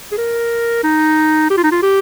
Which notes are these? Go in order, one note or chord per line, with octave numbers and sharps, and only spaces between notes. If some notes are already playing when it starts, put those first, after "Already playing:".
G#4
A#4
D#4
G4
F4
D#4
F4
G4